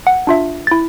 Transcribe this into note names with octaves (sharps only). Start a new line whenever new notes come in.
F#5
D4 F4 E5
E4 A6